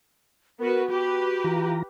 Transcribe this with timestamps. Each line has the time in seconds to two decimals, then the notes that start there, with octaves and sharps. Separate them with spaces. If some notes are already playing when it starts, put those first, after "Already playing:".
0.59 B3 F#4 A#4 B4
0.90 F#4 G4 B4
1.44 E3 F4 A#5